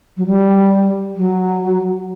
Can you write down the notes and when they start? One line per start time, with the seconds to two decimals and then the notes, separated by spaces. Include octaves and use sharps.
0.17 F#3
0.26 G3
1.16 F#3